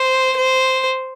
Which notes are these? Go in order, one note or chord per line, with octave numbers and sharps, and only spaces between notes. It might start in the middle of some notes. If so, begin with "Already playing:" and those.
Already playing: C5
C5